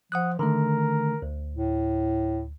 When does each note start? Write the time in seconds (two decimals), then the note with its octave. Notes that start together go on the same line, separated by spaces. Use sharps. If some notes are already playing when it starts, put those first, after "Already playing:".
0.12 F3 F#5 D#6 F#6
0.39 D3 D#3 A3 A#4
1.22 D2
1.53 A2